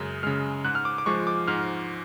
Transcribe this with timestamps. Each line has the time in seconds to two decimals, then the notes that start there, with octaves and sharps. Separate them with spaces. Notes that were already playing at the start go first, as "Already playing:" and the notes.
Already playing: F#2 C#3 G#3
0.23 C#3 G#3 F6
0.65 G#2 F#6
0.75 F6
0.85 D6
0.98 D6
1.06 F3 G#3 C#6
1.27 D6
1.48 G#2 F6